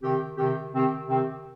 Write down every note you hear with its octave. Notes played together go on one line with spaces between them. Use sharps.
C3 D#3 C4 G4
C3 D#3 C4 G4
C3 D#3 C4 G4
C3 D#3 C4 G4